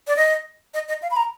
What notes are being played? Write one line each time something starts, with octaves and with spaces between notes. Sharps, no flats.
D5
D#5
D#5
D#5
F5
B5
A#5